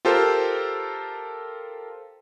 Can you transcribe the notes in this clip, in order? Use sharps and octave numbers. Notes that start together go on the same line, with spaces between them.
F4 G4 A4 A#4 C5